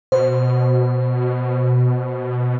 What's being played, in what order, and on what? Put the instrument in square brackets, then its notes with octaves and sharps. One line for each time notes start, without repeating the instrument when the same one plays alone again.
[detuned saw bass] B2 [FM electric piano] C5